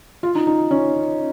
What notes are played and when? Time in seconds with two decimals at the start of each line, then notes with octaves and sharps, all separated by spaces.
0.23 F4
0.35 D#4
0.47 D#4
0.71 C#4